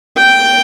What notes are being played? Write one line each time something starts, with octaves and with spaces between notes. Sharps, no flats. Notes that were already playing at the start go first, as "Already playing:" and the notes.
G5